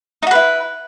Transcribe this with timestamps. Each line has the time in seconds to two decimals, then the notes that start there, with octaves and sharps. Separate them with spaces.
0.23 D#4
0.27 F#4
0.31 B4
0.35 E4